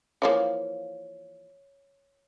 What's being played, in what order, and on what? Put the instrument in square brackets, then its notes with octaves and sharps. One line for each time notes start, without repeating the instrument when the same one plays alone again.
[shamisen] E3 F3 A#3 [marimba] C#5